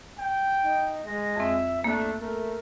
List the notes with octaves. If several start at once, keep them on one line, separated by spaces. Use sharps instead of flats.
G5
D#4
G#3 A#6
F2 C4 E5
A3 A#3 D4
A3 A#4